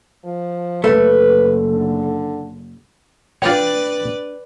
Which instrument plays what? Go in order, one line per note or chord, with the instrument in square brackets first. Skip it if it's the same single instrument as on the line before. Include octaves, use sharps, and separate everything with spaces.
[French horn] F3
[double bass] F#1 [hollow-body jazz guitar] A3 [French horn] B4
[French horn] D3
[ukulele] D4 G5 [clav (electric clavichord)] F4 C#5 [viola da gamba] B4 D5